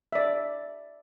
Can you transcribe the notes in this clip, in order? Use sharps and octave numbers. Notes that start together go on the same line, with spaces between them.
D5 E5